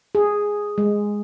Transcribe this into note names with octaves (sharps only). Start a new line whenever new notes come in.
G#4
G#3